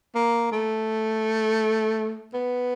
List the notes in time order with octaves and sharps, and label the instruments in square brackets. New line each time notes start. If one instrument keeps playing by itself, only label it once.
[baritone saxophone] A#3
A3
B3